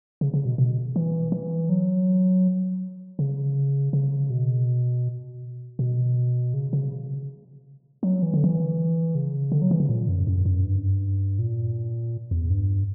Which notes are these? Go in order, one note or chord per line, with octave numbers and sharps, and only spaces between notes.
C#3
C#3
B2
B2
E3
E3
F#3
C#3
C#3
B2
B2
C#3
C#3
F#3
E3
D3
E3
C#3
D3
F#3
E3
C#3
A#2
F#2
F#2
F#2
G2
A#2
E2
G2